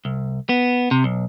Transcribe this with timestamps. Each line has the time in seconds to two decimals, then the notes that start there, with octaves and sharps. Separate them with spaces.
0.05 C2
0.49 B3
0.91 C3
1.04 B1